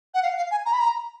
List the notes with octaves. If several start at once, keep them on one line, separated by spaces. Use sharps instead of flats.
F#5
F5
F5
G#5
A#5
B5
A#5